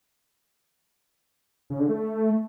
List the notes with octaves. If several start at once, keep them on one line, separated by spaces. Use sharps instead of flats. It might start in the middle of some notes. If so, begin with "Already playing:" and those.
C#3
D3
A3